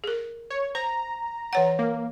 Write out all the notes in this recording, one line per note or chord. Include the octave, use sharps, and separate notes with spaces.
G#4 A#4
C#5
C5 A#5
E3 C#5 F#5
A#3